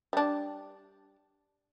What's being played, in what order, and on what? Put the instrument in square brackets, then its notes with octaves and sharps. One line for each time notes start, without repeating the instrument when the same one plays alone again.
[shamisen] G3 D4